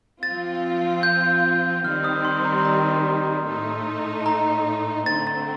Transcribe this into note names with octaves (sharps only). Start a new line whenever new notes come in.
F3 C4 F4 A6
G6
D#3 G3 C4 D#4 F6
D#6
C6
A#5
C6
A#5
A2 A3 D#4
A#5
D3 A3 C4 A6
A6